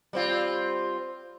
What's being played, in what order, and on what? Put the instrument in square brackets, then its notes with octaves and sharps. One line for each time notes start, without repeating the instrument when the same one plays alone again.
[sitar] G3 C4 F4